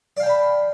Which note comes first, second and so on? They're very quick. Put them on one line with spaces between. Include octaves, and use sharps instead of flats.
D5 F5 G5 A5 B5